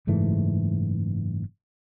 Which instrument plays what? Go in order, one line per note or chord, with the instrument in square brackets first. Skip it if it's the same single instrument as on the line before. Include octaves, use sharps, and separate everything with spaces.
[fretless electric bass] F#1 G#2 E3 A3